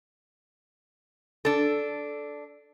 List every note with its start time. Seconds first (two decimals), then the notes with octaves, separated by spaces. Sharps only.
1.45 D4 A4